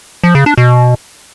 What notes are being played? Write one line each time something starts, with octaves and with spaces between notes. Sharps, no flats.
F3
C#3
D4
B2